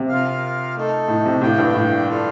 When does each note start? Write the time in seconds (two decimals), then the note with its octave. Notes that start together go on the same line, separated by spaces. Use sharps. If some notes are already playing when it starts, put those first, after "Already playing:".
Already playing: C3
0.09 F4 A#4 F5
0.75 A3 D#4 A4
1.08 A2
1.25 C3
1.42 A2 A#3 D4 G4 D5 G5
1.58 G2
1.75 A2
2.08 D4 F4 A4